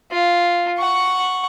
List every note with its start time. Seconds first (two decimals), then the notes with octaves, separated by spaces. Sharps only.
0.11 F4
0.78 F#5 C#6